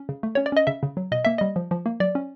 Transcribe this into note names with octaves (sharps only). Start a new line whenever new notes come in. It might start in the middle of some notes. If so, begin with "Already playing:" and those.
Already playing: C#4
C#3
A3
C#4 C#5
D5
C#4 D#5
C#3 E5
C#3
F#3
B2 D#5
A#3 E5
G3 D#5
F3
F3
A#3
F#3 D5
C#4